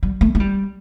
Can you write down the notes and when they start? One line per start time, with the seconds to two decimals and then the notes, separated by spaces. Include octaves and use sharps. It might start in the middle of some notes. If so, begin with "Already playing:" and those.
0.03 G3
0.21 A3
0.35 A3
0.40 G3